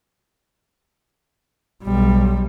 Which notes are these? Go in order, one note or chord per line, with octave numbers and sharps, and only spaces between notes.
B1 G3